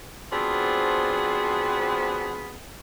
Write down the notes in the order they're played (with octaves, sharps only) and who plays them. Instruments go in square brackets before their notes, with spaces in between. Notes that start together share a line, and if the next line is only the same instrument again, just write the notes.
[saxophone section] F3 B3 C4 D4 F#4 G#4